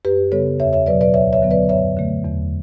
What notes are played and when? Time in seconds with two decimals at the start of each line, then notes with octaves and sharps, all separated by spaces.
0.05 F#2 G4 B4
0.32 C#3 G3 B3 A4 C#5
0.60 E2 C#5 E5
0.73 C#5 E5
0.86 B2 F#3 B4 D5
1.01 B4 D5
1.14 D2 C#5 E5
1.33 C#5 E5
1.42 D3 F#3 B3
1.51 B4 D5
1.69 F#2 C#5 E5
1.97 D3 A3
2.25 E2